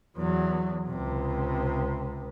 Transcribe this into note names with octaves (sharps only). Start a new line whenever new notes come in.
E2 F#3
C#2 C3